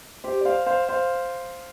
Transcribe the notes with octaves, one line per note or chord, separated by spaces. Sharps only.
G4 C5
D5
C5 F5
C5 F5
C5 F5